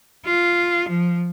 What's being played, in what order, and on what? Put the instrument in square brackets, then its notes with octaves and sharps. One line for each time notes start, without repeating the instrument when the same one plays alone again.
[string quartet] F4
F3